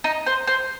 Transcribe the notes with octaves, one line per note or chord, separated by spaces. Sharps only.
D#4
C5
C5